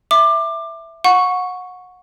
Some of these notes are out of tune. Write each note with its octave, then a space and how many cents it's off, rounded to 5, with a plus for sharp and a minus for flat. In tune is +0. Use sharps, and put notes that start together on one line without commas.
E5 +0 D6 +20
F#5 -25 C#6 +0